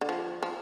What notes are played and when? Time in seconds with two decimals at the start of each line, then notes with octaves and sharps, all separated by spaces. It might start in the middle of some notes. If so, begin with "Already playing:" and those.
0.01 D3
0.09 F3
0.43 F3